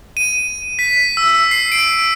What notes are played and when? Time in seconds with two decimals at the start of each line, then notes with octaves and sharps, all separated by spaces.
0.17 D#7
0.79 B6
1.17 E6
1.51 C7
1.72 D7